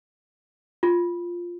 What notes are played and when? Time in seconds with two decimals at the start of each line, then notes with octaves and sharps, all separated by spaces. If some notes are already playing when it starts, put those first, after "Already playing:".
0.83 F4